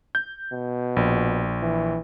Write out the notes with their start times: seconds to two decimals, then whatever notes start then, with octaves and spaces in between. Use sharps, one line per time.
0.15 G6
0.52 B2
0.96 A#1
1.62 E3